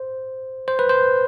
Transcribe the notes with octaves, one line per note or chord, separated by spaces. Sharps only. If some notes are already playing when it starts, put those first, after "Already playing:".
Already playing: C5
C5
B4
C5